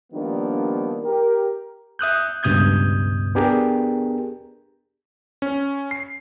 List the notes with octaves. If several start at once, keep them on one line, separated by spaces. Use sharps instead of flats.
D#3 F3 G3 A#3 B3 D4
G4 A#4
E5 D#6 F#6 G6
C#2 G2 B2 D#6 G6 G#6
B3 D4 G4 G#4 A#4
C#4
C7